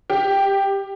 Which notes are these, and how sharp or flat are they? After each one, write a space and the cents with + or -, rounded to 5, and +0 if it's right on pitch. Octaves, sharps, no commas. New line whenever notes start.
G4 +10